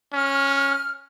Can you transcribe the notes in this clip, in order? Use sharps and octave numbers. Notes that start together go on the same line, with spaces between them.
C#4 F6